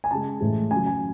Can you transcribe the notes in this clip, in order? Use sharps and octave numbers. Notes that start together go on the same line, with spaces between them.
G#5
C#3 G#3 A5
A2 E3 G#3
C#3 G#5
F#3
G#5